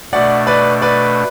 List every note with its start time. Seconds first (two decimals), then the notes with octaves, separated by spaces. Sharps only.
0.12 B2 A3 D4 D5 F#5
0.47 B4 D5
0.81 B4 D5